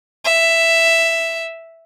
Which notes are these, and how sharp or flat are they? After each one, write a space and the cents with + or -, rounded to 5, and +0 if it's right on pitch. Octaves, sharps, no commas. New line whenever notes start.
E5 +5